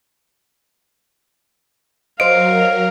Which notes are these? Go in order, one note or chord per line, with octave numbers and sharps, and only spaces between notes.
F#3 A#4 C5 D#5 F5 D7